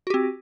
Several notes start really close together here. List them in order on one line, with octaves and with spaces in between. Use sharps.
F#4 G4 C4